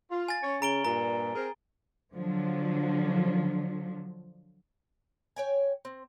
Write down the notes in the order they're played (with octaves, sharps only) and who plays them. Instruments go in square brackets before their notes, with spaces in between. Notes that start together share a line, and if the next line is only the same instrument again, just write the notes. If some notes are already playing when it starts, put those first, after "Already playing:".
[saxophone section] F4
[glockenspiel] G#5 A6
[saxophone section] C#4 C#5
[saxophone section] C#3 [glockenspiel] A#5 D7 G7
[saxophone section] G2 A#2 [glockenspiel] A#5
[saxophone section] C4 G#4 A#4
[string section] D3 F3 F#3
[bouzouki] C#5 G5 G#5
C4